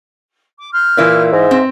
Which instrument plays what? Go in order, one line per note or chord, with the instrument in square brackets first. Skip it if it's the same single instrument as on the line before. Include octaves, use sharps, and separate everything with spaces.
[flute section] D6
C6 F6 G6
[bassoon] A#2 [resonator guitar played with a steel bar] E3 E4 B4
[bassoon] G#2 [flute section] D#5 E5
[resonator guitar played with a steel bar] C4